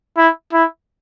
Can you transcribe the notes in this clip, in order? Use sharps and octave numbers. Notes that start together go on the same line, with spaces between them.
E4
E4